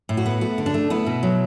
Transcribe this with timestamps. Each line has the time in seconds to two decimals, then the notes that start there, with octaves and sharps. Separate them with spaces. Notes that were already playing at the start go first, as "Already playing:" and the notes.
0.09 A2
0.17 F#4
0.26 B3
0.41 A3 F#4
0.58 D3
0.66 D4
0.74 A3
0.90 B3 E4
1.06 B2
1.23 F#3